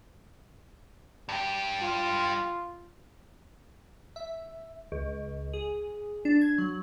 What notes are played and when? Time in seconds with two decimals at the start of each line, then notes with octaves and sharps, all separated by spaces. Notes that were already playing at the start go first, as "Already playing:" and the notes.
1.29 G2 G4
1.82 F4
4.16 E5
4.92 C#2
5.53 G#4
6.25 D4
6.41 G#6
6.58 F#3